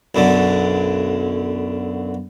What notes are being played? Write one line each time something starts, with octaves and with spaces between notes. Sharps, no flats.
B1 F#2 D3